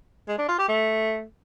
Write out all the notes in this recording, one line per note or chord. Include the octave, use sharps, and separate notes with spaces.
G#3
D4
F4
G4
A3